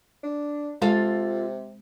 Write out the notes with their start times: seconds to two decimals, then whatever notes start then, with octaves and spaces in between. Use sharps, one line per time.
0.23 D4
0.82 C3 G#3 F4 A4 F5